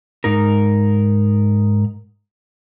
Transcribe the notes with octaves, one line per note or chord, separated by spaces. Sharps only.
G#2 D#4 A#4